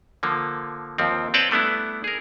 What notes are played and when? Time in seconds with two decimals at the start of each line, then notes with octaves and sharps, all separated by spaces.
0.23 D3 F3 A#3
0.98 D#2 F3 C4
1.34 C4 B4 C#5 D5 G5 A5
1.51 G3 A3 B3 D4 E4
2.04 G#4 A#4